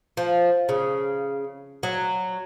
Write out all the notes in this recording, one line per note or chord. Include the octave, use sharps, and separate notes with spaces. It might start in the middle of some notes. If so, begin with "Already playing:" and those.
F3
C#3
F#3